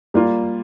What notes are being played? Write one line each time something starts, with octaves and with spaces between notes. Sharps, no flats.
G3 A#3 F4